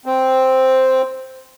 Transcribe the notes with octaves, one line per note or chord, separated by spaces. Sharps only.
C4